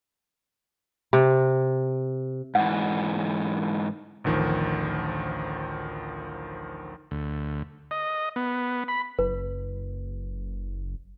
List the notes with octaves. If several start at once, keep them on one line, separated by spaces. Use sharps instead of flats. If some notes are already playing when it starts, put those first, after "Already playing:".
C3
G#2 E3 F#5
A1 D2 D#3 F3
D2
D#5
B3
B5
F#1 B4